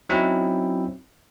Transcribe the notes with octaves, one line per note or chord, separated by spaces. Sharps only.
F#3 C4 C#4 D#4 E4 E5